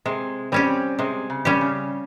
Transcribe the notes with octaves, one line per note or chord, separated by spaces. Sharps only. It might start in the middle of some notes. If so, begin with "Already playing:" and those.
C3 G#3
G3 C4 C#4 G4
C3 G#3
C#3
G3 C#4 G4
C#3